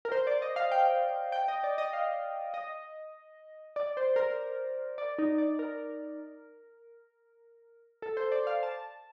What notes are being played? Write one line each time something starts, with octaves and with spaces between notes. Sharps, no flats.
A#4
C5
D5
D#5
F5
G5
G5
D#5
D5
D#5
F5
D#5
D5
C5
A#4
D5
D#4
D5
A#4
A4
C5
D5
F5
A5